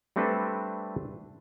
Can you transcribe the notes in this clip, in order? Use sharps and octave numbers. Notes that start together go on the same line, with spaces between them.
G3 A3 C4 D4 A4 B4